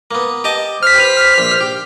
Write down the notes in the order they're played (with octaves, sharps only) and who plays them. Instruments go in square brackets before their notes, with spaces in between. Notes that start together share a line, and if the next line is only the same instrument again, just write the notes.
[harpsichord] A#3 B3
G4 D#5 A5
[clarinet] C5 [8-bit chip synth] F6 B6
[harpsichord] G4 B4
A#1
G4